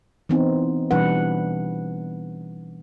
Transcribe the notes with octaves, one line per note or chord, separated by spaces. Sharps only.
E3 B3 C4 D#4
B2 E3 G3 D4 B4 F#5